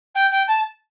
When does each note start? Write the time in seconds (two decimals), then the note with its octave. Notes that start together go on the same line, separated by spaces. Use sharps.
0.15 G5
0.31 G5
0.47 A5